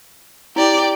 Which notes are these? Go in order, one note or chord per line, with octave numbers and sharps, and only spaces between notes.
E4 G4 D5